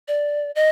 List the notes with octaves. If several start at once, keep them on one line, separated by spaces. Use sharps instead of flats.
D5
D#5